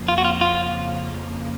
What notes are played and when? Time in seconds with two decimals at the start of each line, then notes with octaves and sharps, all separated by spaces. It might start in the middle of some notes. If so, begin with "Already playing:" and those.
Already playing: F2 C#3 F3 A#3
0.08 F4
0.18 F#4
0.25 F4
0.41 F4